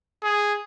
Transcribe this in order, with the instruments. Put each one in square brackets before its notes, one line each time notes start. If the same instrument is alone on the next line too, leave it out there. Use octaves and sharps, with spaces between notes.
[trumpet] G#4